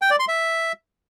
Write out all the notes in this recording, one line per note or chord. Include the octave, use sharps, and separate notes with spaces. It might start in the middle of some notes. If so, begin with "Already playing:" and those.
G5
D5
C6
E5